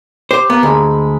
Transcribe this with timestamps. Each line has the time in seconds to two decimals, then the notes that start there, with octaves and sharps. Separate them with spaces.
0.31 G4 C5
0.50 A#3 B3
0.63 D2 G#3 B5